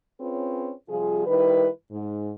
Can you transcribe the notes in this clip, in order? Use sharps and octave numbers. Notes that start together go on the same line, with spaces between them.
C4 C#4 F4 G#4 B4 C#5
C3 F3 G3 F4 G#4
D#3 G3 E4 B4
G#2